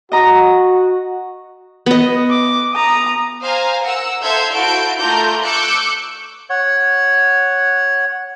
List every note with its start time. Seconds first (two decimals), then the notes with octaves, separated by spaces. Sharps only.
0.12 F#4 D#5 A#5 D#6
1.86 B3 D#5
2.30 D6
2.73 A#5 D#6
3.42 C5 F5 G#5 A#5
3.83 A#4 F#5 E6
4.22 A4 C5 E5 F5 G6 G#6
4.53 E4 F#4 A4 F5 G6 D7
4.98 A3 F4 A#4 A#5 D6 G6
5.42 C#6 D6 E6 F#6 G6 C#7
6.50 C#5 F#5